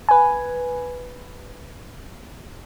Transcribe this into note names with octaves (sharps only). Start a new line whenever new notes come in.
B4 G#5